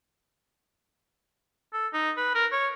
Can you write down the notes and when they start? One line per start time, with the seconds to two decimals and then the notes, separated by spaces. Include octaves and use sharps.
1.73 A4
1.94 D#4
2.17 B4
2.35 A#4
2.52 C#5